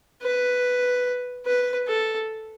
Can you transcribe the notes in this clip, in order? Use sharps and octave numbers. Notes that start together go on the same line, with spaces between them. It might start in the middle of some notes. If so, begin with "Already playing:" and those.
B4
B4
A4